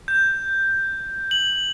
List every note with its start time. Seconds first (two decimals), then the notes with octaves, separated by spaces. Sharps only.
0.08 G6
1.31 F#7